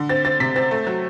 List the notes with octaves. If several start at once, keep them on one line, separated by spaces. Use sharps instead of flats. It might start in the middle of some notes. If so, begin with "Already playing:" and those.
Already playing: D3
C4 A6
C4 A6
C3 B6
C4 A6
A3
F#3